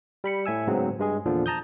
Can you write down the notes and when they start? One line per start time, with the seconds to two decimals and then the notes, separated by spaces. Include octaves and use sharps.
0.24 G3 B5 C#7
0.46 A2 E5 G#5 E6
0.67 G#2 C#3 F#3 B3 C4
0.99 G2 G#3 G#4
1.25 E2 A#2 D3 F3
1.46 A5 A#5 D#6 G6